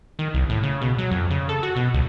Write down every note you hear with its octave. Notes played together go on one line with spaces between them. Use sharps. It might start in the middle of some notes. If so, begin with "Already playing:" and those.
D#3
C2
A2
C#3
B2
F#3
F2
C#3
A4
F#4
B2
C#2